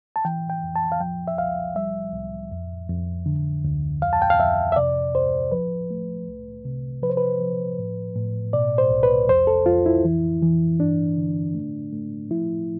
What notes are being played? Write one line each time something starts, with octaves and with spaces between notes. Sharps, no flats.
A5
E3 G5
G5
F2
A5
F5
F3 G5
E5
C2 F5
G3 E5
C2
F2
F2
D3
D2
F2 F5
A5
G5
F5
F2 E5
E5
C3 D5
D2 C5
F3 B4
A3
C2
C3
F3 B4
C5
B4
F3
A2
A2
B2 D5
C5
C2
B4
F2 C5
A4
F2 F4
E4
E3
E3
G2 D4
D3
A3
A3
F3 E4